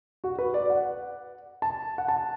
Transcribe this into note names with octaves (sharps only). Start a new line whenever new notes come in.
F#4
B4
D5
F#5
A5
F#5
A5